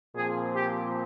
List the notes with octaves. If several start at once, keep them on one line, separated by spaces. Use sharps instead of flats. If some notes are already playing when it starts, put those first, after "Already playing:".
A#2 F3 C4 G#4
G4